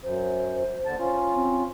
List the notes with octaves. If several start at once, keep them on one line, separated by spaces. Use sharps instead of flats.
F#2 C5
D#2 D3 A5
C#4 F4
C4